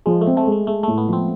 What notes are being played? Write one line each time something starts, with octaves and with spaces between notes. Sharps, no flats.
F3 G#3
A3
C4
A3
G#3 A3
G#3 A3
A2 A3
B3
F3 C4